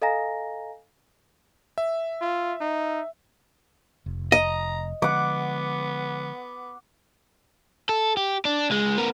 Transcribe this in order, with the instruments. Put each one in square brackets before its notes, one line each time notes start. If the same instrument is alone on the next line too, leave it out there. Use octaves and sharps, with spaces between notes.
[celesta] A4 D#5 F5 G#5 A#5 A#6
[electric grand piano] E5
[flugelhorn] F4
D#4
[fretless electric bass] F1
[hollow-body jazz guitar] D#5 [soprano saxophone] A#5
[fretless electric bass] D3 F3 G#3 [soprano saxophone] B3 [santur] F#5 D6
[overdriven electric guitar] A4
G4
D4
C#2 G#3
B3 A#4